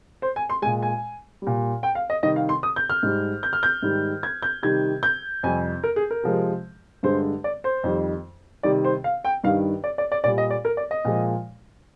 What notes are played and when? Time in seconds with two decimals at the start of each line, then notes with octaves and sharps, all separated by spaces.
0.22 C5
0.36 G#5
0.50 C6
0.62 G#3 G#5
0.66 A#2
0.82 G#5
1.42 A#2 G3
1.83 G5
1.95 F5
2.10 D#5
2.23 C3 D#3 G3 D#5
2.36 F5
2.49 C6
2.63 D#6
2.76 G6
2.90 F6
3.03 G#2 G3
3.43 G6
3.53 F6
3.63 G6
3.82 G#2 D#3 G3
4.23 G#6
4.42 G6
4.63 C3 D#3 G3 G#6
5.03 G6
5.43 F2 C3 G3 G#5
5.83 A#4
5.96 G#4
6.11 A#4
6.23 C3 F3 G#3
7.03 G2 D3 G#3 C5
7.44 D5
7.64 C5
7.84 F2 D#3 G3
8.63 C3 D#3 G3 D5
8.85 C5
9.04 F5
9.25 G5
9.44 G2 D#3 G3 F5
9.84 D5
9.98 D5
10.12 D5
10.24 A#2 G3 D5
10.38 D#5
10.50 D5
10.65 A#4
10.77 D5
10.91 D#5
11.05 A#2 F3 G#3